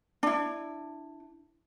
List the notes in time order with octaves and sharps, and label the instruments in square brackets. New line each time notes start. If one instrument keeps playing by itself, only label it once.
[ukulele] D4 E4